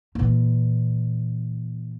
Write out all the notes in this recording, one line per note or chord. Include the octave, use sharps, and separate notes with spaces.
A#2 E3